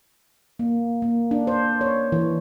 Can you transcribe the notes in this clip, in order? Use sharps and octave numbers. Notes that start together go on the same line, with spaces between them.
A#3
A#3
D4
C5
C#5
E3